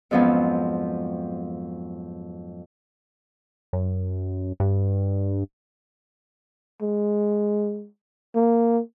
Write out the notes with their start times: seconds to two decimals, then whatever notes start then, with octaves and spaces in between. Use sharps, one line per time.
0.11 F2 G#2 F3 F#3 B3 C#4
3.73 F#2
4.60 G2
6.82 G#3
8.35 A#3